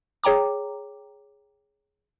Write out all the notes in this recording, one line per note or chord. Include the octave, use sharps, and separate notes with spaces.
G#4 C#5 G5 A#5 D6